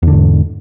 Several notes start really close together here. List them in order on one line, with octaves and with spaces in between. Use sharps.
E2 D3 G#2